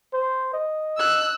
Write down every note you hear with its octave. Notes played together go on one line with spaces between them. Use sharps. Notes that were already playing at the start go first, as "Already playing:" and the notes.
C5
D#5
E6 F#6